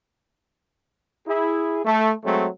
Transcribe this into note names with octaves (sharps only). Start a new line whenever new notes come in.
E4 G#4
A3
F#3 G#3 A3 C4